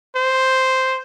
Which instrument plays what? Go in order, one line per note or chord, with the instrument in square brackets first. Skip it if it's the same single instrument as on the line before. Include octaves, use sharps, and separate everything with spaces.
[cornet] C5